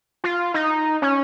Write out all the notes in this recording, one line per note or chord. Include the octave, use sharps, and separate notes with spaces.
F4
D#4
C#4